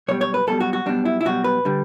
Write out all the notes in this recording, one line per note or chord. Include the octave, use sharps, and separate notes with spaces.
B1 B2 G3 C#5
C#5
B4
B1 B2 G3 A4
F#4
F#4
B1 B2 G3 D4
E4
E4
B1 B2 G3 F#4
B4
D3 G3